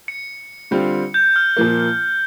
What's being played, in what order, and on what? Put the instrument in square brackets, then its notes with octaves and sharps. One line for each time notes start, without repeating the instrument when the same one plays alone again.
[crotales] C#7
[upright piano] D3 G3 C4 F4
[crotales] G6
F6
[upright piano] A#2 F3 A#3